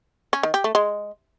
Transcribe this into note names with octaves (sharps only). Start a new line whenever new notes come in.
C#4
D#3
G4
A3
G#3